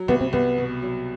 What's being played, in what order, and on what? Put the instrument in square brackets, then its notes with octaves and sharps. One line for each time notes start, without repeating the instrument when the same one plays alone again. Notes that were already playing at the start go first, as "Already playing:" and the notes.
Already playing: [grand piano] F#3
[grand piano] C2 [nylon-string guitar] B3
[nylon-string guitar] C4
[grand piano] C2 [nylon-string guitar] B3
[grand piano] B2
F#3